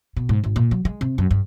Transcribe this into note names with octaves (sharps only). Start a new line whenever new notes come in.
B2
G#2
G#1
A#2
F#3
G#3
C3
F#2
G2